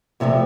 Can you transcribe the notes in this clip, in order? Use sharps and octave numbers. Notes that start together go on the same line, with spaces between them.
E2 C3 F3 A3